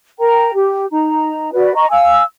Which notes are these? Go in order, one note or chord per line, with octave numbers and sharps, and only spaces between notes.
A#4 G5 A#5
G4
D#4 A#5
F#4 B4 D5
D#5 A#5 C#6
F5 G#5 E6